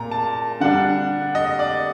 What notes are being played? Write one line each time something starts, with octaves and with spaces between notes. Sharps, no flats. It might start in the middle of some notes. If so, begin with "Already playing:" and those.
Already playing: A#2 A#5
A5
D3 G3 D4 F#5
D#5
D5